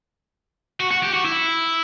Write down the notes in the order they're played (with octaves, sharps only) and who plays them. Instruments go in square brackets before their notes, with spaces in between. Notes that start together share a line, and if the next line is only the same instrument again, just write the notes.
[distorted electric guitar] F#4
F#4
G4
F#4
E4